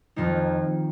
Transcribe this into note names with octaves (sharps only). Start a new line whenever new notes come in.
F2 D#3 A#3 D#4